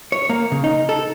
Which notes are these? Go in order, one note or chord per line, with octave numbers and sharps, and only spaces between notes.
C#5
A#3
C#3
D#4
A4